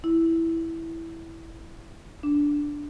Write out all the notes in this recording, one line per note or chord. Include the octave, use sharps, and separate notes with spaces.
E4
D4